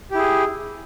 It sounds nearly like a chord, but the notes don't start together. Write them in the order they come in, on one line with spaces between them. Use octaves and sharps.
G4 E4 G#4